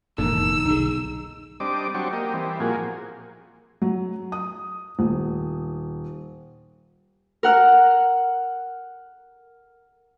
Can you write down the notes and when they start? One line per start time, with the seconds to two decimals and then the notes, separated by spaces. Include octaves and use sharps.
0.18 E1 F2 A2 D#3 A#3 D#4 A4 E6
0.65 B1 D3 D#4 G#4
1.60 G3 C4 D4 D#5 D6
1.94 F#3 C4 D4 G4 C#6
2.13 A#3 G4 D#5
2.33 E3 G3 C4
2.60 A#2 F3 A#3 F#4 G#4
3.82 F#3
4.32 D#6
4.99 D#1
7.43 A#4 F#5 F6